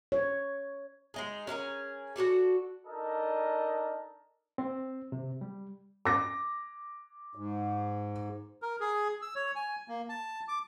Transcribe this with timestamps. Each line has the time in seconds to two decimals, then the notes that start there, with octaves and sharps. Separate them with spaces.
0.12 C#5
1.14 G#3 D#4 G#4
1.47 C#4 D4 G#4 A#4
2.16 F#4 G4 A4 D5
2.87 D4 D#4 A4 A#4 D#5
4.58 C4
5.12 C3
5.41 G3
6.05 D6 A#6
7.35 G#2
8.62 A#4
8.80 G#4
9.22 E6
9.35 C#5
9.55 G#5
9.88 A#3
10.09 A5
10.48 D6